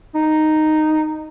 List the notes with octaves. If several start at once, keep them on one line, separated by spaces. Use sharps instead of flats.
D#4